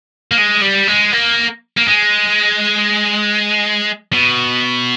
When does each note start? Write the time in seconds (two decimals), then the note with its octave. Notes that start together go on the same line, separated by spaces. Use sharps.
0.31 A#3
0.38 G#3
0.62 G3
0.88 G#3
1.13 A#3
1.77 A#3
1.87 G#3
4.13 B2